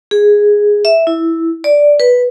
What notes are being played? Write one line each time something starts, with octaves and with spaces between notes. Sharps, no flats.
G#4
E5
E4
D5
B4